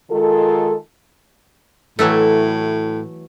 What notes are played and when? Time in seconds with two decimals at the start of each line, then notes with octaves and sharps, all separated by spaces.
0.11 D#3 G#3 F4 A4
1.99 A2 E3 F#3 A3